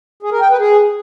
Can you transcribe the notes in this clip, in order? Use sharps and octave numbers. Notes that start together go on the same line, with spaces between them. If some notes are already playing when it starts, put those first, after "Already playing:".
G#4
A#4
G5
B4
G#4